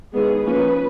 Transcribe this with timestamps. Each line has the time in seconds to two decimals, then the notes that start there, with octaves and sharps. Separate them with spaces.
0.14 D#3 G#3 B3 G#4
0.44 F3 A#3 C#4 B4